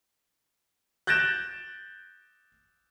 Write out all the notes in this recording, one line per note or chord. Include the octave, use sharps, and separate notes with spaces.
F#6 G6 A6 A#6 D7 E7